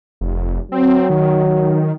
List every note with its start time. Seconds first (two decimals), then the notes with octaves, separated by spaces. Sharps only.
0.21 F1
0.72 F#3 C4
1.10 D#3